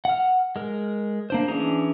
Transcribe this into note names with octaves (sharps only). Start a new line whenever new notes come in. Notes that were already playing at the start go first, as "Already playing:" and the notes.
F#5 F6
G#3 A#4
A#3 D4 C5
E3 C#4 D4 G#4 A#5